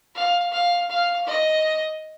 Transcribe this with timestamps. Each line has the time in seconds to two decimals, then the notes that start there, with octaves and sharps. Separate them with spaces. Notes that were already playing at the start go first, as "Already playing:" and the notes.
0.15 F5
0.52 F5
0.90 F5
1.27 D#5